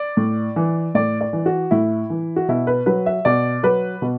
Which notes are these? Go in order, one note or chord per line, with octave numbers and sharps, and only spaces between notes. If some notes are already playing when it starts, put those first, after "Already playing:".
Already playing: D5
A2
E3
A2 D5
D5
E3
F#4
A2 E4
E3
F#4
B2 E4
B4
F#3 B4
E5
B2 D5
F#3 B4
B2